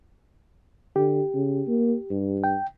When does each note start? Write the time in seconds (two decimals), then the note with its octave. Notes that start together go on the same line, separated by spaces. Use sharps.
0.96 D3 G4
1.34 C#3
1.68 A#3
2.10 G2
2.44 G5